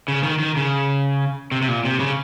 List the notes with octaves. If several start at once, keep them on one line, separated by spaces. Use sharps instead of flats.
C#3
D#3
D#3
C#3
C3
C3
A#2
C3
C#3